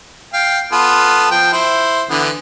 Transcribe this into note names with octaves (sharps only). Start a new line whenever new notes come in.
F5 G5
B3 F4 A4
F3 G5
E4 C5
D3 E3 B3